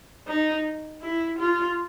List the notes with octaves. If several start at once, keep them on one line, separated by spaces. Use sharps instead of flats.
D#4
E4
F4